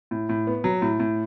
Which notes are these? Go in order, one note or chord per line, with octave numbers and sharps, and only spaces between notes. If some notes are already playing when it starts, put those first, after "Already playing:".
A2
A2
B3
F#3
A2
A2